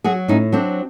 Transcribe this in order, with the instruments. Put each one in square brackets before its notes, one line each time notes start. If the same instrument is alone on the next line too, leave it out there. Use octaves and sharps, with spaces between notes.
[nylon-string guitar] F#3 F#4 G#4
A2 C#4 D#4
F#3 C4 D4